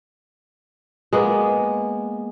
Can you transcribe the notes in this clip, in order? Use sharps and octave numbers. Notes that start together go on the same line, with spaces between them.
G#3 A#3 B3